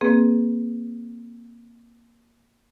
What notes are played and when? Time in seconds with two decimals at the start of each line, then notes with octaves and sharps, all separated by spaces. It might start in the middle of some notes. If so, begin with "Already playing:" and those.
0.01 A#3 C4 G#4 B4